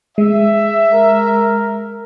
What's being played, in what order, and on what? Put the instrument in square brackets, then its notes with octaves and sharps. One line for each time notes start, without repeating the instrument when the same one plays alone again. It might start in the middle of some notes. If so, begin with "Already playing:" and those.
[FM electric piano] G#3 [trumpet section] E5
[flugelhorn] A#4